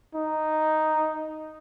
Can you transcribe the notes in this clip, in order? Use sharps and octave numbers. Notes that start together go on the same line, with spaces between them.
D#4